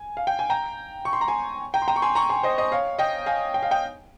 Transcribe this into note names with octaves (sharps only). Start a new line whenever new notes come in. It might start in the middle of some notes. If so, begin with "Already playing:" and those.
Already playing: G#5
F5
G5
G#5
G5 A#5
C#6
C6
A#5
G#5 C6
G5 A#5
C6
G5 A#5
C#6
G#5 C6
A#5 C#6
G#5 C6
C5 D#5
C5 D#5
C#5 F5
D#5 G5
F5 G#5
G5
F5
D#5 G5